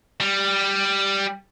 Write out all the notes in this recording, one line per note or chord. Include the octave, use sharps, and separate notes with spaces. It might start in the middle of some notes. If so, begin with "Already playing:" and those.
G3